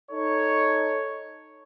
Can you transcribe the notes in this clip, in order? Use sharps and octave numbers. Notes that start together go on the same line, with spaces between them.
D#4 A4 C#5